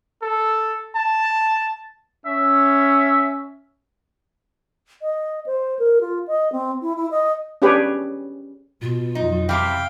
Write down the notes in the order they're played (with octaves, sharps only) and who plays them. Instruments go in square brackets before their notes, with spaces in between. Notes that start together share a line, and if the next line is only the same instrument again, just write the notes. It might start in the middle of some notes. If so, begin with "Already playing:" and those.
[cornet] A4
A5
[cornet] C#4 [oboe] E5
[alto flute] D#5
C5
A#4
F4
D#5
C4
E4
E4
D#5
[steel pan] C#4 D4 G4 G#4 B4 C#5
[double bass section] B2 [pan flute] F4
[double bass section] F2 F#3 [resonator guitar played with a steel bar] D#4
[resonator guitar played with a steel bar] C3 E3 [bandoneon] F5 G5 [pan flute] D6